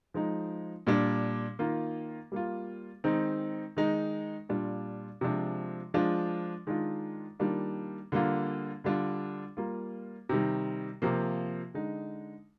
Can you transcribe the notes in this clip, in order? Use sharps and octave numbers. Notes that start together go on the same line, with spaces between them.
F3 G#3 D#4
A#2 G3 D4
D#3 A#3 F4
G3 A#3 F4
D#3 G#3 C4 D#4
D#3 G#3 D#4
A#2 G3 D4 F4
C3 F3 G#3 D4
F3 G#3 D4 F4
D#3 G#3 D4 F4
D#3 G3 A#3 D4 F4
D3 G3 A#3 F4
D3 G3 D4 F4
G3 A#3 F4
C3 D#3 G3
C3 F3 A#3
D3 G#3 D#4